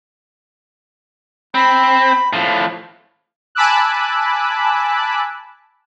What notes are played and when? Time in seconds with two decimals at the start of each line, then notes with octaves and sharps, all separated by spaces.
1.55 C4 B5
2.33 A2 F3
3.55 G#5 A5 B5 D6 E6 F#6